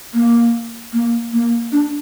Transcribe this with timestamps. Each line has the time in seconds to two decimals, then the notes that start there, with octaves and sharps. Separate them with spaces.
0.14 A#3
0.93 A#3
1.33 A#3
1.72 D4